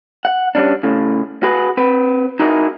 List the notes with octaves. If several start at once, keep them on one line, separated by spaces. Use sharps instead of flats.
F#5
G3 C#4 D4
A2 C#3
F#4 G#4 B4
C4 B4
D#4 E4 F#4 G#4 A#4 D#5